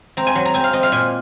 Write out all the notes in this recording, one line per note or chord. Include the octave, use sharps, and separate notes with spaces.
C4 A#5
G#5
F#3
A#5
C4 G#5
F5
C4 D#5
F5
A#2 G#5